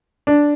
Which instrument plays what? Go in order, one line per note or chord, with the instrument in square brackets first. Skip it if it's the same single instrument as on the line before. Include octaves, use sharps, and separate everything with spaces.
[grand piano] D4